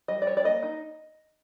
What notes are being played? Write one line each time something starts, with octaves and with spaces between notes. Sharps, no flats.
G3 D#5
D5
G3 C#5
D5
A#3 D#5
D#4